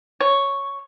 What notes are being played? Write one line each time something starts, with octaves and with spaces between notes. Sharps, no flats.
C#5